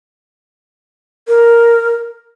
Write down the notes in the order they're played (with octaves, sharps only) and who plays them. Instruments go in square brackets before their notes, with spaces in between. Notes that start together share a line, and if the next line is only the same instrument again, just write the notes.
[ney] A#4